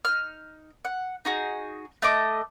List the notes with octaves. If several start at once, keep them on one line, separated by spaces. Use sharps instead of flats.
D#4 F6
F#5
D#4 F#4 G#4
A3 D#5 D6